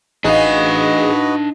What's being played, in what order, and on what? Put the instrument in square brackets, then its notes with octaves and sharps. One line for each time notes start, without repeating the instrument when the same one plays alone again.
[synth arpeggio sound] A1 G#4 [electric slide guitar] D4 F5 [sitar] D#4 [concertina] F#4 B4 D#5